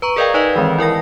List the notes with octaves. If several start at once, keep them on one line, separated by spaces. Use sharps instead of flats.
B4 A#5 C#6
G#4 A#4 D5 D#5 F5 G5
D#4 B4 D5 D#5
D#3 E3 G#3 C4
E4 A#4 G5 A#6